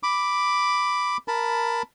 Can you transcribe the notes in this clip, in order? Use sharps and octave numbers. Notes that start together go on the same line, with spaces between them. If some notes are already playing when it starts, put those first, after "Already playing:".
B5 D6
A#4 A5 B5